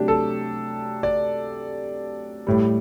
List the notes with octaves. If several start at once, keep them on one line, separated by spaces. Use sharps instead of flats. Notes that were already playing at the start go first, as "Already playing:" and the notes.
Already playing: C3 F#3 A3 D4 G4
A4
D5
A2 G3